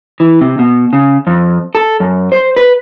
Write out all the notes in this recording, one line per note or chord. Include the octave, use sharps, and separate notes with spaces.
E3
C3
B2
C#3
F2
A4
F#2
C5
B4